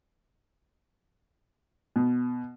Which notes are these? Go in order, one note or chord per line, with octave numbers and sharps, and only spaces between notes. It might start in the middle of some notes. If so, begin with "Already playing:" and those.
B2